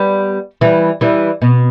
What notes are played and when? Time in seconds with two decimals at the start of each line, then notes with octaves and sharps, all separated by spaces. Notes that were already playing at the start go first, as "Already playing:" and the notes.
Already playing: G3 B3
0.61 E3 G3
1.01 E3 G3
1.42 B2